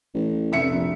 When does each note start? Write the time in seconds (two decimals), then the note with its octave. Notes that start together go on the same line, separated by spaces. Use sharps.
0.14 A1
0.52 F1 E5 C#7
0.72 A#1